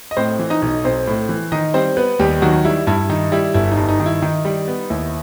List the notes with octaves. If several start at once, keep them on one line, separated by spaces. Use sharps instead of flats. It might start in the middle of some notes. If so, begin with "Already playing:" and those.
D#5
A2 C4 C5
E3
D#4 D#5
B1
B1 C4 C5
A2
E3
D#3 D#4 D#5
G3 C4 C5
B3 B4
D#2 G3 G4
D#3 F#3 F#4
G3 E4
G2 E4
D#3 D#4
G3 E4
G1 E4
D#4
G2
D#4
D#3
E4
D#3 D#4
G3
B3
D#2 E4